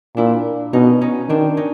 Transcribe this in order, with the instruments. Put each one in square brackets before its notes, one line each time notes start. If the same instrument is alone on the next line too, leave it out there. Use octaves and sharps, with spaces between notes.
[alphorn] A#2 [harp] D4 E4
[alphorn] B2 [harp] C#4 D#4
[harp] C#4 D#4
[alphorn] D#3 [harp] C4 D4
[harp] C#4 D#4